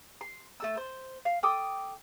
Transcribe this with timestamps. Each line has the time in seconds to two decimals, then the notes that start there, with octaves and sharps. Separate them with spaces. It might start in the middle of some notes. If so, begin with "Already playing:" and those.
0.21 C6
0.60 A3 A4 E6
0.77 C5
1.25 F5
1.43 A4 G5 D6 D#6